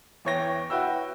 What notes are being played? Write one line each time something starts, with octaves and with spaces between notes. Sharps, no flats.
E2 E3 C#5 G5 A#6
E4 F#4 B4 G5 E6